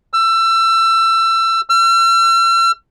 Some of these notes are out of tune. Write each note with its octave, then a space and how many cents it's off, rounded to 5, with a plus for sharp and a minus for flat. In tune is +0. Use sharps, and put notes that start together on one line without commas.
E6 +25
E6 +45